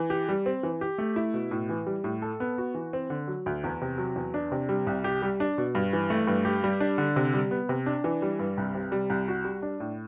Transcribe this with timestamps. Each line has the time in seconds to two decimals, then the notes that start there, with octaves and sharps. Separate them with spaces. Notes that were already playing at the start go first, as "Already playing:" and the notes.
Already playing: E3
0.10 G4
0.29 G3
0.46 C4
0.63 E3
0.81 G4
0.98 A3
1.16 E4
1.34 B2
1.51 A2
1.69 E3
1.86 G3
2.04 A2
2.22 A4
2.40 B3
2.58 F#4
2.74 E3
2.93 C4
3.10 D3
3.28 F#3
3.46 D2
3.64 E2
3.81 C3
3.98 F#3
4.16 E2
4.34 D4
4.52 C3
4.69 G3
4.87 C2
5.04 G4
5.22 G3
5.40 D4
5.58 B2
5.75 G2
5.93 E3
6.10 A3
6.27 G2
6.45 G4
6.64 G3
6.80 D4
6.98 D3
7.16 C3
7.34 G3
7.51 B3
7.69 C3
7.86 D4
8.04 E3
8.22 G3
8.39 G2
8.57 C2
8.74 C3
8.92 G3
9.10 C2
9.28 F#4
9.45 G3
9.62 D4
9.80 A2